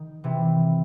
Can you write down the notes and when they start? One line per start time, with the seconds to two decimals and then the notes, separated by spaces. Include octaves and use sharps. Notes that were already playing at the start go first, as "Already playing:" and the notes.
Already playing: D#3
0.24 C3 E3